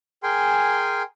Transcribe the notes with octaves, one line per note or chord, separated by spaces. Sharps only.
G#4 A#4 G5 G#5 C6